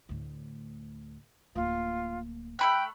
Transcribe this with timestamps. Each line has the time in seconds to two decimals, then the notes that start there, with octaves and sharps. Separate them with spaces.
0.09 D2 A2
1.55 D1 A#3 F4
2.59 A3 G5 B5 F#6